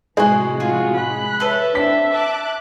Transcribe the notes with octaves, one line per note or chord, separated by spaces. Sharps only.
A2 C3 F3 G#3 F#4 G#4
F4 F#4 G#4
B5 F#6
A4 B4 C#5 E5
C4 D4 E5 B6
A5 D6 F#6